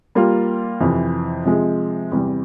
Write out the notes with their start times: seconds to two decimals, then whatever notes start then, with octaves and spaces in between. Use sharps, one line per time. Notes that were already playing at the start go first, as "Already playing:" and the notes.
0.15 G3 A#3 F4
0.80 F2 C3 E3
1.45 C3 F3 G#3
2.12 E2 C3 G3